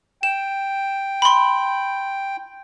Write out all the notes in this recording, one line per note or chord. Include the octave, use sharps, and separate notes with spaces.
G5 E7
B5 C6